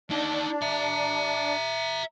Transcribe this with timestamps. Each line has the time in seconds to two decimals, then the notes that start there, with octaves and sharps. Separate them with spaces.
0.11 D4 D#4 G4
0.62 E5 A#5